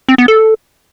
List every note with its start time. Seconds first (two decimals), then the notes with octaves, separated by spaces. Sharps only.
0.09 C4
0.18 B3
0.28 A4